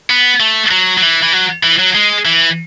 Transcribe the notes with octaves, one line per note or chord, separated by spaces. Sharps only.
B3
A3
F#3
F#3
E3
E3
F#3
E3
F#3
G#3
E3